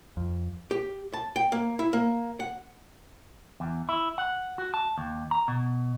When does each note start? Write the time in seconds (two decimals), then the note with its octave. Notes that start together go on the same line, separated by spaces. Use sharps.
0.17 F2
0.71 G4
1.13 A5
1.36 G5
1.52 A#3
1.79 E4
1.93 A#3
2.40 F#5
3.60 E2
3.89 E4
4.18 F#5
4.58 F#4
4.74 A5
4.98 D#2
5.31 A#5
5.48 B2